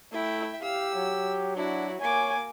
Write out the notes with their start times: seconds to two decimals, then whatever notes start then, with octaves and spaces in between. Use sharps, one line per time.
0.13 A3 E4 E5 G5
0.62 G4 F5 E6
0.97 F#3
1.56 D4 E4 F#4
2.01 A#3 C#5 G#5 D6